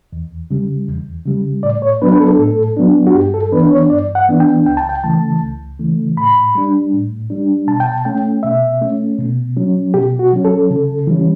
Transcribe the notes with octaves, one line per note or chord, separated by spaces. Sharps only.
E2
C#3 G3
E2
C#3 G3
A2 D5
C#5
F#3 B3 D4 B4
B4
A4
A2 A4
F#3 B3 D4
F#4
G2 G4
A4
E3 B3 D4 B4
C#5
G2 D5
F#5
E3 B3 D4
G5
C#2 G5
A5
G5
C#3 E3 A3 A5
C#2
C#3 E3 A3
A2 B5
G3 D4
A2
G3 D4
B2 A5
G5
A5
A3 C#4 G5
B2 E5
A3 C#4
B2
F#3 C#4
B2 G4
F#4
F#3 C#4
A4
C#3
E3 G3 C#4